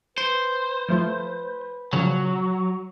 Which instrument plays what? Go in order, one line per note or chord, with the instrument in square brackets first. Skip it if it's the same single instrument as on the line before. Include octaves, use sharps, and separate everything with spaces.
[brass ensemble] B4 [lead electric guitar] C5
[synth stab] F3 A3 F4
[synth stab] A#2 C#3 F3 [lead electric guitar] F#3